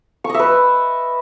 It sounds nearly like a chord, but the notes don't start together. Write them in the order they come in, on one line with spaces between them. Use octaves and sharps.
C#6 D#5 E5 B4